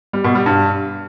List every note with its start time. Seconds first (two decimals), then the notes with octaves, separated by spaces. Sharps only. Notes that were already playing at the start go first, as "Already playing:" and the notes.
0.13 G3
0.24 B2
0.35 G3
0.46 G2